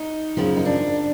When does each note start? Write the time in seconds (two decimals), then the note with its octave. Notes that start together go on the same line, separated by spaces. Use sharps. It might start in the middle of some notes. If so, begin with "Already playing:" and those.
Already playing: D#4
0.37 F#2 C#3 F3 A#3
0.57 D#4
0.65 D4